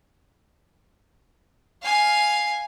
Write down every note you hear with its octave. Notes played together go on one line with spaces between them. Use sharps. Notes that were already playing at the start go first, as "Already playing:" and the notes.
F5 G#5